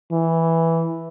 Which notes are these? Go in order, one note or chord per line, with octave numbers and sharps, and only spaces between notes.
E3